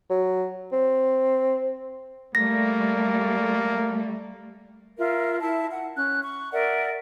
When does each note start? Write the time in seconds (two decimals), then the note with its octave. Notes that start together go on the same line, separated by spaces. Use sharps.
0.10 F#3
0.72 C4
2.35 G3 A3 A#3 A#6
4.99 F4 A#4 E5
5.40 E4 E5 A5
5.72 F#5
5.96 C#4 F#6
6.22 C#6
6.53 A#4 D5 E5 F#5